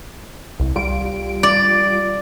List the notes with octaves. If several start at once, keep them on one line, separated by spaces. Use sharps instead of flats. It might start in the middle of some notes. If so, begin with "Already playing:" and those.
C2
G3 F4 D7
D5